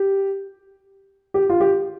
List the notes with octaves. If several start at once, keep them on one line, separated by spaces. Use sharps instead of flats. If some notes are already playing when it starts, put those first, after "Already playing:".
Already playing: G4
G4
F4
G4